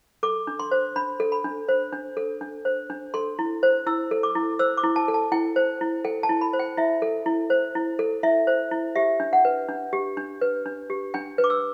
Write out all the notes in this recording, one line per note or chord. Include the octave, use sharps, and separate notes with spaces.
A4 D6
D4
C6
C5
D4 B5
A4
B5
D4
C5
D4
A4
D4
C5
D4
A4 C6
E4
C5
E4 E6
A4
D6
E4
C5 E6
D6
E4
A5
A4
A5
E4 G5
C5
E4
A4 G5
A5
E4
B5
C5
G5
E4 E5
A4
E4
C5
E4
A4
E4 E5
C5
E4
G4 E5
D4
F#5
B4
D4
G4
D4
B4
D4
G4
D4 G5
B4
D6
E6